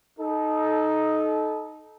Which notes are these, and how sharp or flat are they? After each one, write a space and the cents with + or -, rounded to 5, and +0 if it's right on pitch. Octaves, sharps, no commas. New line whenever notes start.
D#4 +0 A4 -25